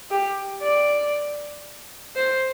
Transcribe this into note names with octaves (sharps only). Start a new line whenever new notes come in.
G4
D5
C5